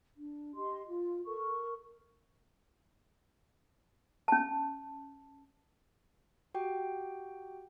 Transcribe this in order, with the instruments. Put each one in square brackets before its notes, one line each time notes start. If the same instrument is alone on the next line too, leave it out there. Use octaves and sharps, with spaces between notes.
[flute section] D4
G4 D#5 C6
F4
A4 A#4 C#6
[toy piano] C#4 A5
[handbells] F#4 G4 G5